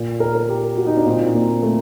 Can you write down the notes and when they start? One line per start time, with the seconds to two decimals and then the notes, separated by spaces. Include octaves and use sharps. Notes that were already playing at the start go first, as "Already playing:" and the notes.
Already playing: A#2
0.20 A#4
0.35 A#4
0.49 G4
0.77 F#4
0.87 D#4
0.97 D4
1.06 A#2 C4
1.34 A#3
1.63 A3